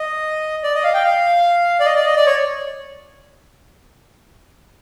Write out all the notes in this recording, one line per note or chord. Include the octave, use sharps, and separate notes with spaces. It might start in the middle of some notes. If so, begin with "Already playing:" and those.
Already playing: D#5
D5
D#5
F5
G5
F5
D5
D#5
D5
D#5
D5
C#5